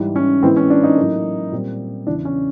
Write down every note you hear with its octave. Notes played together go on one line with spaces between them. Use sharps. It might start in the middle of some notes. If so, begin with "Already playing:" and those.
Already playing: G#2 E3 G3
C#4
A2 E3 G#3 B3 C4
C#4
D4
D#4
A2 F#3 A#3
A#2 G3 C4
E2 C#3 E3 D4
C#4